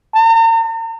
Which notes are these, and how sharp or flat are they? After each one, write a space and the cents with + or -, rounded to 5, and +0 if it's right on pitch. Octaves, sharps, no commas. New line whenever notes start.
A#5 -40